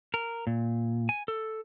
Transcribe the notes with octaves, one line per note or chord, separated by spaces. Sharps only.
A#4
A#2
G#5
A4